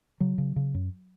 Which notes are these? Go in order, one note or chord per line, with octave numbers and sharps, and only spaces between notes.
C#3 F#3
C#3
C#3
F#2